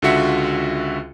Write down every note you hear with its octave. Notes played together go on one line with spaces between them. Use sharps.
C#2 D3 F4 F#4 E5 C#7